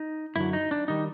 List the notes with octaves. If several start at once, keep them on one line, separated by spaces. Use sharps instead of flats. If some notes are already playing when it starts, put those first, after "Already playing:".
Already playing: D#4
F#2 D3 F#3 E4
D#4
D4
D#3 G3 D#4